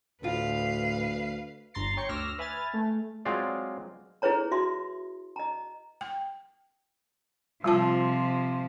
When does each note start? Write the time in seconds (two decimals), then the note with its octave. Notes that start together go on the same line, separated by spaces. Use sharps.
0.23 D2 A2 F4 B4 F5
1.74 G1 G2 A#5 C6 A6 C7
1.97 C#5 G5 C6 C#6
2.09 D2 D6 E6 F6 A#6
2.38 B4 E5 G#5 F6 A6
2.73 A3
3.25 F#3 G#3 C4 F4 D5 F5
4.22 E4 G#4 B4 C#5 A#5
4.51 F#4 E5 C6
5.36 D#5 A#5
6.01 G5
7.64 C3 F3 G3 F4 A5